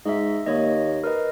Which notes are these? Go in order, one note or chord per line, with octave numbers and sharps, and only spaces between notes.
G#2 D#5 E5
D#2 A#3 C#5 D#5
A#4 B4 D#5